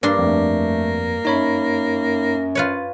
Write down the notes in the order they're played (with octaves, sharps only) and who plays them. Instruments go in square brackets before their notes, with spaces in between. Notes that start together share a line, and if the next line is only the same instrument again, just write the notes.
[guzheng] G2 D4 C6 [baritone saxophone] A#3
[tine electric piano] F2 [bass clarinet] A3
[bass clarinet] F#2 [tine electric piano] D#4 C#5 B5
[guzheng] F4 B4 C#5